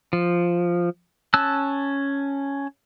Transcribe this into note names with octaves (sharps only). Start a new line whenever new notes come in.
F3
C#4 A5 E6 F#6